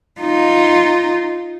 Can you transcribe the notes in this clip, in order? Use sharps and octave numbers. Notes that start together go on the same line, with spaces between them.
D#4 F4